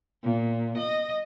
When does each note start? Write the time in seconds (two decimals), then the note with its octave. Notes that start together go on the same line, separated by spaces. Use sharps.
0.24 A#2
0.78 D#5